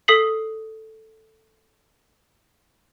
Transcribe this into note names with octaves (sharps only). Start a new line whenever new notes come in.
A4 D#6 B6 C7 F#7